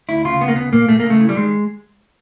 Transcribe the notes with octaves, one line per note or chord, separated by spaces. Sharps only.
D2 E4
C#3 F4
D#2 B3
A#3
C#3 B3
A#2 A#3
A#2 A3
C#3 A#3
A3
E3
G3
D#3 G#3